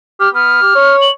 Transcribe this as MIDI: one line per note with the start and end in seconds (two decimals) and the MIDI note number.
0.20 0.29 67
0.20 0.30 89
0.35 0.60 59
0.35 0.96 89
0.62 0.73 67
0.75 1.09 73
1.01 1.11 102